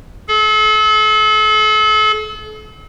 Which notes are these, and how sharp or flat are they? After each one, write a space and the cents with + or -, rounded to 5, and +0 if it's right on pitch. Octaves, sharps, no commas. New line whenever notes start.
A4 -40